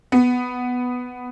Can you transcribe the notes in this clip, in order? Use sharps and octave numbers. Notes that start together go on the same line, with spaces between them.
B3